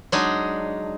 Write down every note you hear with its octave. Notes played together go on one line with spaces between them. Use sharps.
F#3 G#3 D4 D#4 G#4